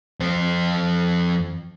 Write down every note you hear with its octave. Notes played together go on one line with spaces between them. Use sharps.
F2 C5